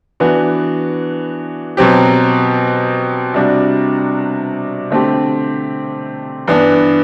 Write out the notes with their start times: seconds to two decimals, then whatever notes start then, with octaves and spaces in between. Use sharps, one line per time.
0.20 E3 B3 D4 F#4
1.77 B2 F#3 C4 G4
3.34 C3 G3 D4 F#4
4.90 D3 A3 C4 G4
6.48 G2 E3 B3 D4